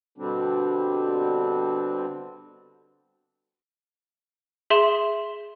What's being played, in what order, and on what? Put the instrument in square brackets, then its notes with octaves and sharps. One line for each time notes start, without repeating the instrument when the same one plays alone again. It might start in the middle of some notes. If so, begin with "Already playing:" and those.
[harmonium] B2 D3 G3 C4 D4
[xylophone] G#4 E5 C6 E7